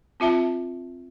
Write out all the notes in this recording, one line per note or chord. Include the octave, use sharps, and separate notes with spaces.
C4 F4 E5 A5